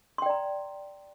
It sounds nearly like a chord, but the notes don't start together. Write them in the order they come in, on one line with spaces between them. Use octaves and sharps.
C6 G5 D5 A#5